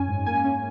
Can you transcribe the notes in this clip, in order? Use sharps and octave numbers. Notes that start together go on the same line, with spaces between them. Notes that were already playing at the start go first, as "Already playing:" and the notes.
Already playing: F#2 C#4 G#5
G#2
A#3 G#5
C#4